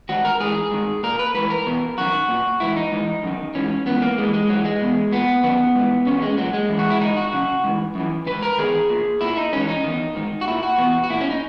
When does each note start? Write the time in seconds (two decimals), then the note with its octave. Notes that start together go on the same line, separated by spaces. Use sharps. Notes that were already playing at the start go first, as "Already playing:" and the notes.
0.09 G#2 D#3 F#4
0.25 A#4
0.40 G#2 E3 G#4
0.71 G#2 D#3
1.03 A#2 A#4
1.19 B4
1.34 G#2 E3 B4
1.50 A#4
1.66 E2 B2
1.97 F#2 D#3 F#4
2.29 A#2
2.60 G#2 E3 E4
2.76 D#4
2.92 G#2 E3
3.24 F#2 D#3
3.55 G#2 E3 C#4
3.86 G#2 E3 B3
4.02 A#3
4.18 G#2 E3 G#3
4.34 G#3
4.49 G#2 E3 F#3
4.65 G#3
4.81 E2 B2
5.12 A#2 B3
5.44 F#2 D#3 B3
5.75 G#2 E3
6.07 E2 B2 C#4
6.22 G#3
6.38 A#2 F#3
6.54 G#3
6.69 F#2 E3
6.79 F#4
6.90 E4
7.01 G#2 D#3 D#4
7.17 F#4
7.33 F#2 C#3
7.64 G#2 E3
7.95 F#2 E3
8.26 G#2 D#3 B4
8.42 A#4
8.58 E2 D#3 G#4
8.90 A#2
9.21 A#2 E4
9.37 D#4
9.53 G#2 E3 C#4
9.68 D#4
9.84 E2 D#3
10.15 G#2 D#3
10.41 F#4
10.47 A#2 E4
10.63 F#4
10.78 E2 B2
11.04 F#4
11.10 A#2 E4
11.21 C#4
11.31 D#4